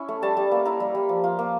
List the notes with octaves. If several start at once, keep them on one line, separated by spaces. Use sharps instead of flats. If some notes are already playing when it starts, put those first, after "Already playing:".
Already playing: C#4 E4
A3
G3 A5
G3
A#3
E4 A#5
G3
G3
F3
F4
A#3